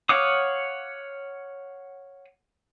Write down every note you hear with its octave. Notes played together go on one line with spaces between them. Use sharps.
C#5 F5 F#5 D6 D#6